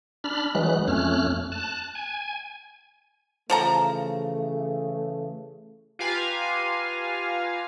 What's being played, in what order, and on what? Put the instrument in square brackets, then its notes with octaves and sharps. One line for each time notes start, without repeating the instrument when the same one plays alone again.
[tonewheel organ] D4 B5 F6
E3 F#3 G#3 F#6
F2 A3 C#4 F6 F#6
A5 F#6
G#5
[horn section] C#3 E3 A3 [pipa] F3 A4 A#5
[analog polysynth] F4 G4 B4 F5 G#5 A#5